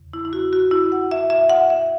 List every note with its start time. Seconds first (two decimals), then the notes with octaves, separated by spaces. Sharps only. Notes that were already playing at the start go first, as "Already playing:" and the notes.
Already playing: E2 C#3
0.13 E4
0.25 E4
0.33 F#4
0.53 F#4
0.71 E4
0.92 F#5
1.11 E5
1.30 E5
1.50 F#5
1.70 E5